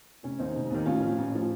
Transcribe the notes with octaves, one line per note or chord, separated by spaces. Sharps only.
F1 C#4
D#2 D#3 C4 D#4
F1
D#2 D#3
A1 C#4 F4
A2 F3
A1
A2 F3